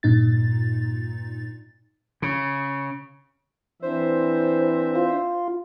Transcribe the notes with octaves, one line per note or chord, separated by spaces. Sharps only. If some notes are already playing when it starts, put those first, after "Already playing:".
G2 A#2 D#4 A6
C#3
E3 C4 D4 C5 E5
F4